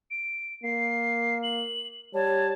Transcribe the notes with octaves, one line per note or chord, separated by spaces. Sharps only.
D7
A#3 C7
F#7
G3 C#5 A5